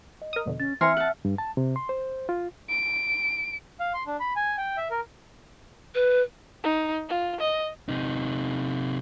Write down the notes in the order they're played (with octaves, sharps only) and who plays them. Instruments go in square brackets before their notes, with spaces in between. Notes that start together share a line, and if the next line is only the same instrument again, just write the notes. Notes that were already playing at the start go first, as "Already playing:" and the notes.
[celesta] D#5
[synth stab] A#4 D#6
F2 B2 D3
[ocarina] C#4 [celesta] A6
[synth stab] E3 C4 [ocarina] E5 [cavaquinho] G#5 A#5 C6 [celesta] F6 C#7
[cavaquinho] F#5 A5
[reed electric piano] G2
A5
C3
C6
C5
F4
[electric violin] D7
[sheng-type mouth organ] F5
C6
D4
B5
G#5
G5
E5
A#4
[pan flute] B4
[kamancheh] D#4
F4
D#5
[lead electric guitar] C3 D#4